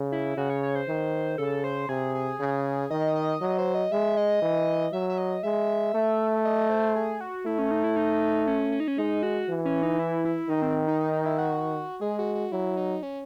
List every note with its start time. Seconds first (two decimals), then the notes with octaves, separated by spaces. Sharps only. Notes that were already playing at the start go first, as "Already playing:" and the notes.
Already playing: C#3
0.12 E4
0.37 C#3 F#4
0.50 C#5
0.63 C#5
0.75 C5
0.88 D#3
1.38 C#3 A4
1.64 C5
1.89 C3 G#4
2.15 G#4
2.40 C#3 G#4
2.90 D#3 D#5
3.15 D#5
3.41 F#3 D#5
3.58 C5
3.75 D#5
3.92 G#3 E5
4.17 D#5
4.42 E3
4.93 F#3 E5
5.09 E5
5.18 D#5
5.43 G#3 E5
5.94 A3
6.45 D#5
6.70 C5
6.96 G#4
7.21 F#4
7.45 A3 E4
7.58 C#4
7.71 D#4
7.84 E4
7.96 D#4
8.47 C#4
8.72 C#4
8.80 D#4
8.88 C#4
8.98 G#3 D#4
9.23 F#4
9.49 E3
9.65 C#4
9.83 D#4
9.99 E4
10.25 E4
10.49 D#3 D#4
10.62 C4
10.88 D#4
11.00 D#4
11.13 D#4
11.26 E4
11.38 F#4
12.01 G#3 G#4
12.19 F#4
12.35 F#4
12.52 F#3 E4
12.77 D#4
13.03 C#4